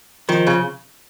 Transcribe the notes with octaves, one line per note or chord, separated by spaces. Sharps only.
D#3 F3
C#3